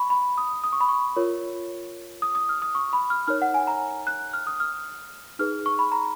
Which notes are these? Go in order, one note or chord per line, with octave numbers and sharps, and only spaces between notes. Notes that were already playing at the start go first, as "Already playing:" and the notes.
Already playing: B5 C#6
B5
D#6
D#6
C#6
B5
C#6
F4 A#4 C#5
D#6
D#6
F6
D#6
C#6
B5
F6
D#4 A#4 C#5 F6
F#5
G#5
A#5
F#6
F6
D#6
F6
D#4 G#4 B4 F6
C#6
B5
A#5